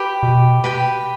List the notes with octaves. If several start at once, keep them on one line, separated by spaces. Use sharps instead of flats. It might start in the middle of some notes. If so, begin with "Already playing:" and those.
Already playing: G4 B4 G5 B5
B2
G4 B4 G5 B5